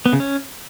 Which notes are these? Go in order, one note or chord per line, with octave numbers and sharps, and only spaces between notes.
B3
C#3
C#4